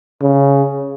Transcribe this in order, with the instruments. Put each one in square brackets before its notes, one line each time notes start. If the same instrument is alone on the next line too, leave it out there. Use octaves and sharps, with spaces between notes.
[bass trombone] C#3